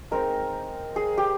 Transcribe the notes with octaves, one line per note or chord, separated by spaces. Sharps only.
G#3 C4 D#4 A#4
G#4
G4